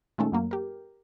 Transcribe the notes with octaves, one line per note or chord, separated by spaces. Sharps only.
A#2 D#3 G#3 A3 C#4 A4
F#2 F#3 A#3
G4 A#4